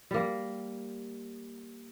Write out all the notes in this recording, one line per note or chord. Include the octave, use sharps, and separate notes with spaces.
G3 A#3